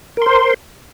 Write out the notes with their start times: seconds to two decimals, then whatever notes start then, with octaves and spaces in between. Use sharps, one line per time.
0.17 A#4
0.22 C6
0.26 C5